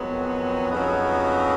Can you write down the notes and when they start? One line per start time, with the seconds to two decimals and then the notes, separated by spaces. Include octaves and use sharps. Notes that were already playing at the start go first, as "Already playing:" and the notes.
Already playing: F2 D#3 F#3 G#3 B3
0.70 F2 C#3 F#3 B3 D#4